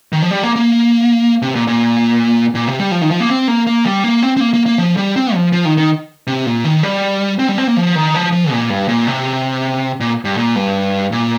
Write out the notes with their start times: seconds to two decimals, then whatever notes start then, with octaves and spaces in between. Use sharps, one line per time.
0.13 D#3
0.22 F3
0.31 G3
0.43 A#3
0.56 A#3
1.42 C3
1.55 A#2
1.67 A#2
2.55 A#2
2.67 C3
2.80 G3
2.92 F3
3.02 D#3
3.11 F3
3.20 A#3
3.29 C4
3.48 A#3
3.67 A#3
3.85 G3
4.04 A#3
4.23 C4
4.37 C4
4.41 A#3
4.54 A#3
4.66 A#3
4.78 F3
4.97 G3
5.16 C4
5.34 F3
5.53 F3
5.65 D#3
5.77 D#3
6.27 C3
6.46 A#2
6.64 D#3
6.83 G3
7.39 C4
7.49 G3
7.58 C4
7.67 A#3
7.77 F3
7.95 D#3
8.14 F3
8.32 F3
8.51 A#2
8.70 G2
8.88 A#2
9.07 C3
10.00 A#2
10.25 G2
10.37 A#2
10.56 G2
11.12 A#2